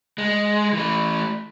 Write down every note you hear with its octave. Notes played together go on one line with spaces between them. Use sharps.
G#3
E3 A3